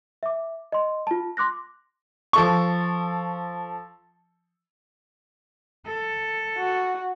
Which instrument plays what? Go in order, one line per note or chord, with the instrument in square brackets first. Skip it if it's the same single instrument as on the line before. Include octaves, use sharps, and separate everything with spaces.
[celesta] E5 D6
D#5 C6
F4 A5
C6 D6 F#6 A#6
[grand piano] F3 A4 C#6
[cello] A4
[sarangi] F#4